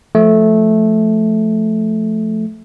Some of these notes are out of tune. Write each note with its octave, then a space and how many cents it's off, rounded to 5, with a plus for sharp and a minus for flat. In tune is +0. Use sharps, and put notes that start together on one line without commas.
F3 +0 A3 -10